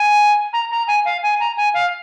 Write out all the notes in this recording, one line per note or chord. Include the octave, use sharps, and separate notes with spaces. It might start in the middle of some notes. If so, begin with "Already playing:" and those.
Already playing: G#5
A#5
A#5
G#5
F5
G#5
A#5
G#5
F5